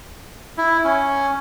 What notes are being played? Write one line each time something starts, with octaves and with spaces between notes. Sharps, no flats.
E4
C#4